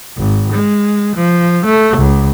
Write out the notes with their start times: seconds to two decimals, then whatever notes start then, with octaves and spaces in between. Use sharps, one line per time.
0.17 G#1
0.53 G#3
1.16 F3
1.66 A3
1.97 C#2